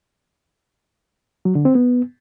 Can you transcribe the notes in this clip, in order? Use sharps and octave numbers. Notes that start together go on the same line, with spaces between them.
F#3
D3
C4
B3